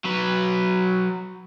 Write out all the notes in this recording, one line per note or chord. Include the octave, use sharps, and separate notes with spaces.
F#3 B4